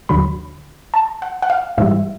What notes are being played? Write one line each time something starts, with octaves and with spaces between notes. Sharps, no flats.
D#2 D3 F#3 B5
A5
F#5
F#5
F5
G#2 E3 G3 E5